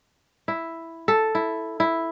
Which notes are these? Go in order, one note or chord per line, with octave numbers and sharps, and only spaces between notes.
E4
A4
E4
E4